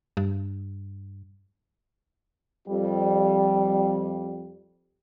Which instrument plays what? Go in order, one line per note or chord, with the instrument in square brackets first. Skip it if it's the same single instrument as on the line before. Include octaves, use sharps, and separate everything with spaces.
[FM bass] G2
[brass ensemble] F2 G3